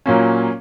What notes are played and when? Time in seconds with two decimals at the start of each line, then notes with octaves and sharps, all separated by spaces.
0.06 A#2 F#3 A#3 C#4